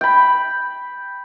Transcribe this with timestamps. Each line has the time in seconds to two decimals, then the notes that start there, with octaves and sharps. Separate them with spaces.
0.01 G5 B5